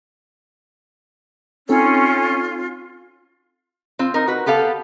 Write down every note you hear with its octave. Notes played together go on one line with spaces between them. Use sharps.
C4 C#4 D#4 F4 A4
C4 F4
D#4 A#4
F#4 B4
B3 G4 A4 F5